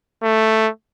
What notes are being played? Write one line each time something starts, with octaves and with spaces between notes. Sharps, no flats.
A3